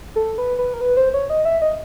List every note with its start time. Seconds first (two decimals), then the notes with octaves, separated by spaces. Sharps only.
0.16 A4
0.38 B4
0.59 B4
0.74 A#4
0.81 B4
0.97 C5
1.14 C#5
1.30 D#5
1.45 E5
1.62 D#5